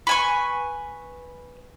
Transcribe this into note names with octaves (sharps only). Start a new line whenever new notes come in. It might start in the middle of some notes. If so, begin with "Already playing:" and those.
B4 G#5 C#6